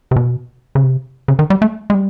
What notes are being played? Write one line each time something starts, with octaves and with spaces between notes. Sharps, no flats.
C3
B2
C#3
C3
C#3
D#3
G3
A3
G#3
G3